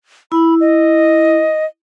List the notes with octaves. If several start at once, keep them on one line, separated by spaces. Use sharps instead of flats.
E4 B5
D#5